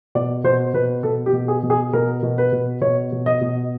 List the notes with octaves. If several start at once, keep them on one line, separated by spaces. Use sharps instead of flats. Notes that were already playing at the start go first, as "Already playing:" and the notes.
B2 D5
B2 C5
B2 B4
B2 A4
G4
B2
G#4
B2
G#4
B2 A#4
B2
B4
B2
B2 C#5
B2
D#5
B2